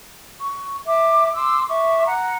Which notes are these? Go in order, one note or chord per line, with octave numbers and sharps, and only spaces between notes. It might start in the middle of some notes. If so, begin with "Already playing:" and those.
C#6
E5 D6
C6 D6 E6
E5 C#6 D6
F#5 A#5